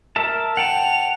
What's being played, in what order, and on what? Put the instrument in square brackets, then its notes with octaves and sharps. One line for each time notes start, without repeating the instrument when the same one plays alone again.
[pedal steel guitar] A#4 E5 A5
[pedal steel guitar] F#5 G5 A5 [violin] F7